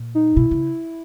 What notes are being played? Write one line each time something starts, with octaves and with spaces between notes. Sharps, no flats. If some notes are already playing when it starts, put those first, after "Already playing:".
Already playing: A#2
D#4
B2 E4
C#3